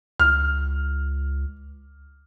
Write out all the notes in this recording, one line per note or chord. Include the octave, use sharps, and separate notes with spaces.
C#2 F6